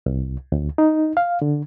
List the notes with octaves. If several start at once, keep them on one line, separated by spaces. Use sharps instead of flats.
C2
D2
D#4
F5
D3